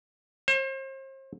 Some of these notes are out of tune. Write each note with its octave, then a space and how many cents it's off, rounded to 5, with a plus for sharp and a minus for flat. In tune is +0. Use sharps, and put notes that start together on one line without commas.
C5 +40